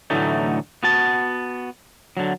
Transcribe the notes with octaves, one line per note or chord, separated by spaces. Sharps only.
A2 D3 E3 F#3 A3 D#4
B3 F#4 A5
D3 F#3